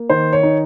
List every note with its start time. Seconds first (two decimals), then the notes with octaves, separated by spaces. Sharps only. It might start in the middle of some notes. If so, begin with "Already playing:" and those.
Already playing: A#3
0.10 D#3 C5
0.33 C#5
0.43 D#4